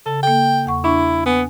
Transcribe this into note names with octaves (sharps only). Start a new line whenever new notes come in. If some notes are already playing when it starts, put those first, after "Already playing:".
C#3 A4
A#3 A4 G5
E2 F#5 C#6
D4 E4 C#6
B3 G#5